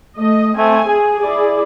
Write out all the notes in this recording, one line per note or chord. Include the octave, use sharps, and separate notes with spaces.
A3 D#5
A3 C4 G#5
G#4 G#5
E4 G#4 D5